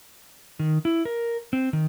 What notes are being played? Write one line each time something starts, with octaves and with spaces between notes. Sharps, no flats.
D#3
E4
A#4
C4
D#3